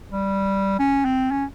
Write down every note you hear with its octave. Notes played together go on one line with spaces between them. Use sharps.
G3
C#4
C4
C#4